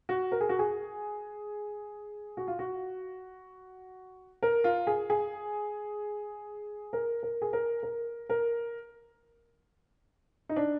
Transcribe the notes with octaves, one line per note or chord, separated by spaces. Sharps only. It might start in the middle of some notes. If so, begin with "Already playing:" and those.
F#4
A#4
G#4
F#4
G#4
F#4
F4
F#4
A#4
F4
G#4
G#4
A#4
A#4
G#4
A#4
A#4
A#4
D#4
D4